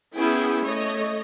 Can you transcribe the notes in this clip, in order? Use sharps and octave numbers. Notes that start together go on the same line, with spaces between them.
B3 C#4 E4 G#4 G5
A3 C#5 D#5